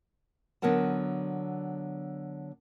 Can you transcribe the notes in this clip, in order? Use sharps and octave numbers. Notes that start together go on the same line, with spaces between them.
D3 F#3 B3 A#4 F#5 A5